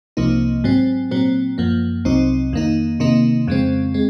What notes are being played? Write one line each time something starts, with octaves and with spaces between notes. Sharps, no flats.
C2 C3 F3 A#3 D#4
G#2 F#3 C4
A#2 F#3 C4
F#2 F3 A#3
C2 C3 F#3 C4 D#4
F2 D#3 A#3 D#4
C3 D#3 A#3 D#4
F2 C#3 G#3 C4
G#3 C4